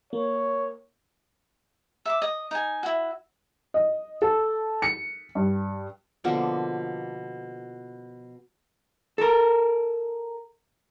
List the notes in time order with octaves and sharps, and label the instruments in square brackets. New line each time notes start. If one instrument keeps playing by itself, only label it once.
[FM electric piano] A#3 [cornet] C#5
[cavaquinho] E5 D6
D#5
D#4 G#5
E4 F#4
[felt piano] D#5
A4
C#7
G2
[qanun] B2 D3 F3 A#3
[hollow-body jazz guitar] A4 A#4